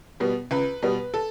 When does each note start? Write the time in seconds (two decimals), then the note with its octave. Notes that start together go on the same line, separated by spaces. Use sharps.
0.20 B2 G3 B3
0.51 C#2 B4
0.82 B2 G3 B3
1.14 A4